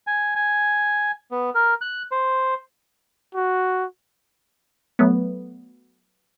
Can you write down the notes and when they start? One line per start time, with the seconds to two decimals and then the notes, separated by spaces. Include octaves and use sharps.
0.07 G#5
0.36 G#5
1.31 B3
1.55 A#4
1.81 F#6
2.11 C5
3.35 F#4
4.99 F#3 A3 B3